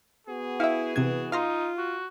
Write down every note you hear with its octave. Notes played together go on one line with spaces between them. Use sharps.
B3 F#4 G#4
E4 E5 F5
C3 E3 G#6
D#4 F4 F5 A#5 C6
F#4